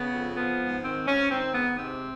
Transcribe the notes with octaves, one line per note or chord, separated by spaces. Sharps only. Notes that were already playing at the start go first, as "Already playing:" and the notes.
Already playing: C#3 B3
F2
F3 B3
G#2
D#3 C4
G#2 C#4
D#3 C4
G#2 B3
C3 C4